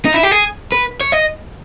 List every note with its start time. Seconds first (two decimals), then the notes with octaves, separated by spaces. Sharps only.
0.05 D#4
0.14 E4
0.23 G4
0.31 G#4
0.72 B4
1.01 C#5
1.12 D#5